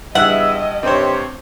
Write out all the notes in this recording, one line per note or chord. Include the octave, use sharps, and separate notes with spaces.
E2 G2 B3 D#5 E5 F#5
G2 C3 C4 C5 C#5